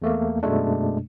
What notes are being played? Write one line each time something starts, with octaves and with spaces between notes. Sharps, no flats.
E2 A3 A#3
F#2 B2 G#3 A3 D4